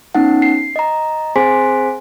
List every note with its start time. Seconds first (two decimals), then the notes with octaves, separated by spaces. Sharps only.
0.15 B3 C#4 D#4 F#5
0.42 C7
0.76 D#5 A#5
1.36 C4 G#4 C5 G#5 C6 B6